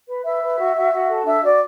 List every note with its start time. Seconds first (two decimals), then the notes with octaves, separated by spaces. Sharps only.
0.08 B4
0.24 B4 E5
0.42 B4
0.58 F#4
0.75 F#4
0.92 F#4
1.09 A4
1.26 D4 E5
1.43 F#4 D5